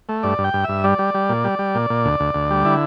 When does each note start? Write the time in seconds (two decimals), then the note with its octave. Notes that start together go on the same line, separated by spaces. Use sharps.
0.09 A3
0.23 G2 D5
0.38 G2
0.44 G5
0.54 G2
0.64 G2 E5
0.84 G3 D5
0.99 G3
1.14 G3
1.29 A#2
1.44 G3
1.59 G3
1.75 A#2
1.90 A#2
2.05 D2
2.20 D2
2.34 D2
2.50 G3
2.65 D3 E4